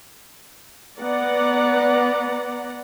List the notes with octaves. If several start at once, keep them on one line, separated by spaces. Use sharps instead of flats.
B3 D5 F#5 A#5